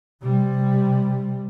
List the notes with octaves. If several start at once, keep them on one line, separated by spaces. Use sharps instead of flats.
C3 G3